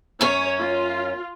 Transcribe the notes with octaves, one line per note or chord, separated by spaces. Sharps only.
F#2 C#4 C#5
F4